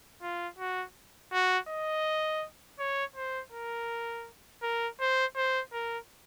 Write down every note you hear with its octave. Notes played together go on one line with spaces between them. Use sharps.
F4
F#4
F#4
D#5
C#5
C5
A#4
A#4
C5
C5
A#4